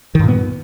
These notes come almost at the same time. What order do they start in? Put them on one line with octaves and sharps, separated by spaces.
D#3 G2 A#2 B3